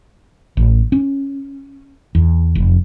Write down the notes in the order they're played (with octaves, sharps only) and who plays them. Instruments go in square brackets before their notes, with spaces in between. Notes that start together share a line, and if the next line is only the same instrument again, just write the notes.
[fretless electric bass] A1
C#4
E2
F1